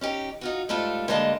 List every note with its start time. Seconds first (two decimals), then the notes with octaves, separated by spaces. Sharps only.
0.01 C#4 D#4 G4
0.41 D#4 F4 F#4
0.69 G#2 G3 A3 F4 A4
1.08 D3 G3 G#3 A#3 D#5 A5